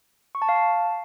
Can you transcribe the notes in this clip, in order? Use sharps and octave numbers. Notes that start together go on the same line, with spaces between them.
C#6
A5
F5
A5